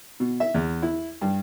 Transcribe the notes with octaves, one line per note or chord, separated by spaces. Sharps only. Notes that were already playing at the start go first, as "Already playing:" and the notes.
B2
E5
E2
E4
G2